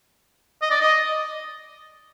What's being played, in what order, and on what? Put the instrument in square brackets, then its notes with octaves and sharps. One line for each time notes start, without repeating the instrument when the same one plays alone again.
[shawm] D#5
D5
D#5